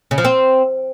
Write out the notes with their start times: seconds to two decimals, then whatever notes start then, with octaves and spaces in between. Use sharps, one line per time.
0.11 C#3
0.18 F3
0.25 C4